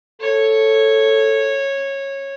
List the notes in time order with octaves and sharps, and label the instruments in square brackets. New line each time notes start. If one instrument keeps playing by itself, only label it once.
[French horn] A4 [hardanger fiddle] C#5